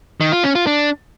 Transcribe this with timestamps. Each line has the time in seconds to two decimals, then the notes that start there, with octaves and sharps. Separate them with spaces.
0.21 D#3
0.32 F4
0.44 C#4
0.55 F4
0.67 D4